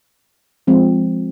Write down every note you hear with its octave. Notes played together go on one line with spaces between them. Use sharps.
F3 G#3 C4